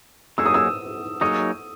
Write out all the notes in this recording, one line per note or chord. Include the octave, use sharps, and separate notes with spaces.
F#3 A#3 D#4 G#4 C#5 E6
D#6
E6
F#3 A#3 D#4 G#4 C#5 D#6